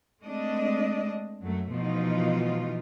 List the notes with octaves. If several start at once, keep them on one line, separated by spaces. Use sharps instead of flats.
G#3 A3 C4 D4 D#5
F#2 F#3 A3
B2 E3 F3 A3 D#4 F4